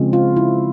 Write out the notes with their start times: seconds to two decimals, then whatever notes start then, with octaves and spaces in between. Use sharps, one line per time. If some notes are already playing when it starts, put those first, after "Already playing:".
Already playing: C#3 F3 G#3 C4
0.13 F4
0.36 E4